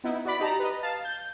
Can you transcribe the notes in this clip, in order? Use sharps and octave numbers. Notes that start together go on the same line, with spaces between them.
B3 D#4 E4
F#4 D5 B5
D#4 G4 A5 A#5
B4 D#5
F5 A5 A6
G6